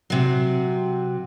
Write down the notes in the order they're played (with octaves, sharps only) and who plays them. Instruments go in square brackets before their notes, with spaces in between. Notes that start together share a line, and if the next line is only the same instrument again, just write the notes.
[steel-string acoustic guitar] C3 F#3